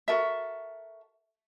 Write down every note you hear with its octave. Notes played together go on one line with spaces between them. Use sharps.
F#4 A4 A#4 E5